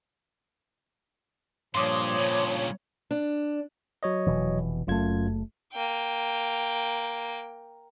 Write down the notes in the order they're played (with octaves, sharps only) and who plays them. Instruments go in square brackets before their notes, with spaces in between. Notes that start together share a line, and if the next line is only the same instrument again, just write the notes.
[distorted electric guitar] G2 [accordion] A#2 F3 [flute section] C#5 [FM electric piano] C6 D6 D#6
[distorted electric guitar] G2 C#3
[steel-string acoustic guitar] D4
[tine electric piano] F#3 C#5 D#5
[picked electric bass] F1 B2 E3
[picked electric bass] F#1 A3 [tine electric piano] F#2 F4 G#6
[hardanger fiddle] A#3 G5